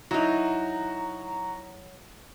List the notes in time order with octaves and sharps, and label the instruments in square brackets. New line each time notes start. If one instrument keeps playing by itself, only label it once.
[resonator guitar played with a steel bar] F#3 D#4 [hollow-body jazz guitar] E4 [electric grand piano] F#4 [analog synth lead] A#5